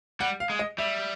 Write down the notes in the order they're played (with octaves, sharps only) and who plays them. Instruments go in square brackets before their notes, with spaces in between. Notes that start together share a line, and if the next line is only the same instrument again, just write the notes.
[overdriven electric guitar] G3 [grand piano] F#5
[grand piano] F5
[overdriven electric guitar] G#3
[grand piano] D#5
[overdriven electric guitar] G3 [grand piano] E5